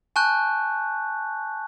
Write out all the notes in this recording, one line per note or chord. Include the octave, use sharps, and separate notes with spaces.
G#5 A5 C#6 F#6 G6